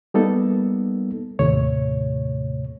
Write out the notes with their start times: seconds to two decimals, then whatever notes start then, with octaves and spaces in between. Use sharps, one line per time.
0.14 G3 A#3 B3 D#4 A4
1.39 D#2 A2 C3 A3 C#5